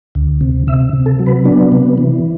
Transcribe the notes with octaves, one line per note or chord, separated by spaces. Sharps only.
D2
C3
C3 E5
C3
A4
F#3
B4
B3 D4
C3
E3